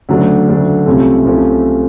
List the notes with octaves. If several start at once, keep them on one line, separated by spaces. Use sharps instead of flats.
D2 C#3 F#3 A3 D4
D2 C#3 F#3 A3 D4
C2 C3 F3 A3 C#4
C2 C3 F3 A3 C#4